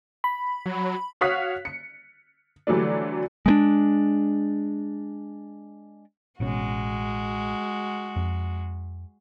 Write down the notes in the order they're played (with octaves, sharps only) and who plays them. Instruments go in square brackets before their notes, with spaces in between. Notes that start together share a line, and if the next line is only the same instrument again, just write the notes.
[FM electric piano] B5
[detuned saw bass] F#3
[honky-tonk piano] F#4 C#5 F5 D#6 F#6 B6
C#7
D3 E3 F#3 G3 A3 D4
[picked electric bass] G#3 A3 D4
[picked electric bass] A1 B2 C#4 [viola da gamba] G#3 F#4
[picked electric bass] F2